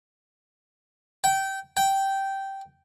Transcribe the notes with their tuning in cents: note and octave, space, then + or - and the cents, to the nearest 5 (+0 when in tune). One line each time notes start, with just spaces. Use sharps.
G5 -20
G5 -10